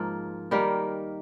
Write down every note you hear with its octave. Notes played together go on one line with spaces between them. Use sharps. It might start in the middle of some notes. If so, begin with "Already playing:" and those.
Already playing: G#2 F3 A#3
D#3 G3 A#3